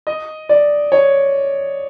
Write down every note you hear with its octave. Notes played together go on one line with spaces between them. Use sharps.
D#5
D5
C#5